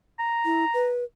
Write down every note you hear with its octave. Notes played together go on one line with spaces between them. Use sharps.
A#5
E4
B4